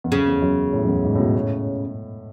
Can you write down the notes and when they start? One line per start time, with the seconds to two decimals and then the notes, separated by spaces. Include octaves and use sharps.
0.04 E2
0.11 F#2 C#3
0.27 E2
0.42 F#2
0.73 A2
0.84 F#2
0.88 E2
1.05 G#2
1.15 A2
1.19 B2
1.35 A2